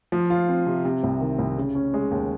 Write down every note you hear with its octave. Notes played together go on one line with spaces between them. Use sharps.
F3
F4
C4
C3
C3
C2
D#3
C2
C#3
C#4
G#3
D#2